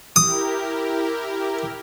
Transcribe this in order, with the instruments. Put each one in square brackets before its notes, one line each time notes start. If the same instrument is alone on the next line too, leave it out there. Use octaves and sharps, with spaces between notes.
[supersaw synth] E4 G4 A#4 [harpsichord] D#6